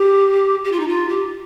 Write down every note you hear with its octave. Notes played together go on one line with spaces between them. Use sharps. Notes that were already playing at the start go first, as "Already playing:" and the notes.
Already playing: G4
G4
F4
D#4
F4
G4